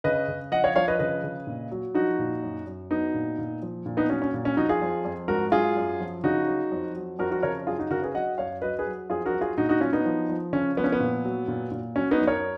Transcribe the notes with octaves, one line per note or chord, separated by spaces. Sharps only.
C#3 B4 D#5
C#3
F3 D#5 F#5
C#5 F5
F3 C#5 F5
B4 D#5
C#3 B4 D#5
C#3
A#2
F#3
F3 D#4 F#4
A#2
F#2
F#2
F#3 B3 D#4
A#2
A#2
F3
A#2
B3 D#4
F#3 C#4
C#4
A#2
C#4
F3 D#4 F#4
F4 G#4
F2
F2
G#2 F#4 A#4
F#3 F4 G#4
F#2
F3
C#3 D#4 F#4
F#3
F2
F#3
F2 F#4 A#4
F#4 A#4
C#3 A#4 C#5
F#2 F4 G#4
D#4 F#4
C#3 F#4 A#4
G#4 B4
F#3 D#5 F#5
F#2 C#5 F5
F#3 B4 D#5
G#4 B4
F#3
F2 F4 G#4
F#4 A#4
F#3
F4 G#4
A#2 D#4 F#4
D#4 F#4
F#3 C#4 F4
B3 D#4
F3
F3
C#3 C#4
F3 B3
C#4
B3
A#2
F#3
A#2
A#2
F#3 C#4
B3 D#4
F#2
A#4 C#5